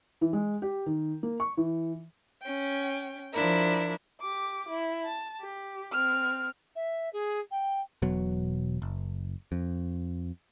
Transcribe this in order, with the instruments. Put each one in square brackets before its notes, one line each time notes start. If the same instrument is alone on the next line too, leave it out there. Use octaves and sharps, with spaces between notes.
[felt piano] E3
G#3
G4
D#3
A#3
C#6
E3
[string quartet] C#4 G5
F3 D4 E4 A#4
[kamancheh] G4 D6
E4
A5
G4
C4 F6
[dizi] E5
G#4
G5
[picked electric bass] E1 B2 F#3
F#1
F2